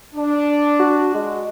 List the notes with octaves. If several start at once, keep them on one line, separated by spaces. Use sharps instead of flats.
D4
F#4
G#3